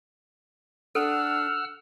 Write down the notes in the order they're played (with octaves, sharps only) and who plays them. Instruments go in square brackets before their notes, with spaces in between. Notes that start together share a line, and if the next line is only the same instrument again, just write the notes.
[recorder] D4 [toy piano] A4 [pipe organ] F#5 E6 F6